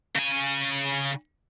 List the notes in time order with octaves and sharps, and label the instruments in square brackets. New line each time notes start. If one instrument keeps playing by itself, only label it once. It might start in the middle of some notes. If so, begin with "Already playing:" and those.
[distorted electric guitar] C#3 G#5